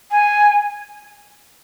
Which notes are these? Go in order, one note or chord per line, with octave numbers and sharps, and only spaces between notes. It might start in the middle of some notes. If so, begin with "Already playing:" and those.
G#5